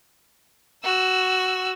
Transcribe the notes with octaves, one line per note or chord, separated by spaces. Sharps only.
F#4 E6